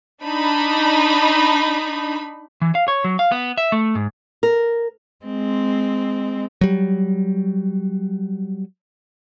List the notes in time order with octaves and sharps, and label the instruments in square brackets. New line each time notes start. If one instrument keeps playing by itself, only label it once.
[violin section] D4 D#4 B5
[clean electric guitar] E3
F5
C#5
F#3
F5
B3
E5
A3
G#2
[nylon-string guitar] A#4
[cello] G#3 C4
[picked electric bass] F#3 G3